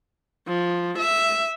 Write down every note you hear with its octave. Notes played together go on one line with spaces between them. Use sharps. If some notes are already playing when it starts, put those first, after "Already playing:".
F3
E5